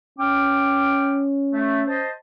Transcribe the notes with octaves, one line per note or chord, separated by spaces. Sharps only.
C#4 G5 D6 F6
A3
C5 D#5 A5